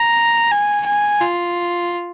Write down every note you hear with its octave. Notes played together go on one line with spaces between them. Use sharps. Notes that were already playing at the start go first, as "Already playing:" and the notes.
Already playing: A#5
G#5
G#5
F4